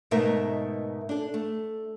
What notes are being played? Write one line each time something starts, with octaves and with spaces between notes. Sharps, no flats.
G#2 B2 A3 D#4 A#4 E5
D4 A4
A3